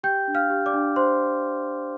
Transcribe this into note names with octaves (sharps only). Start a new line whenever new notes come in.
G4 G5 G6
D4
F5 F6
G4
D5 D6
D4
C5 C6